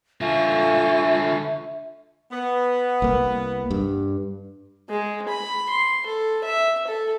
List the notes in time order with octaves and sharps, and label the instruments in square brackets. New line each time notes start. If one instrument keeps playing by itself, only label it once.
[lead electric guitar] D3 F4 [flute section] A4 G#5 C#6 [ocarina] E5
[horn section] B3
[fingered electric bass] C2 A#3
G2
[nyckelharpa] G#3
B5
C6
A4
E5
A4